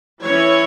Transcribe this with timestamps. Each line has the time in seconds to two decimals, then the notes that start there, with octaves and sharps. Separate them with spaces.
0.23 E3 C#4 E4 C#5